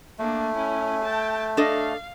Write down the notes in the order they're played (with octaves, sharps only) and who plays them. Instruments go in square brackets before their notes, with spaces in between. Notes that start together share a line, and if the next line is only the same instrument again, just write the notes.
[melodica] A3 [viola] A#3 D4
[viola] C#4 E4
G5 A5
[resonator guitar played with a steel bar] D4 A4 D#5 [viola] F5